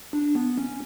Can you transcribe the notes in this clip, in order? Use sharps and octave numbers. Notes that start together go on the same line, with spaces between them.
D4
B3
C#4